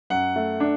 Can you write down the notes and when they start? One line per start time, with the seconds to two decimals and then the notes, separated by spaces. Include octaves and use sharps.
0.10 F#2 F#5
0.36 A3
0.60 D4